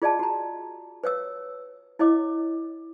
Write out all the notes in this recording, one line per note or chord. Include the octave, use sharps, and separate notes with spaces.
F4 G#4 D5 D#5 F5 A5
F#4 A#5
B4 C#5 F5 E6
E4 C#5 D#5 F5 D6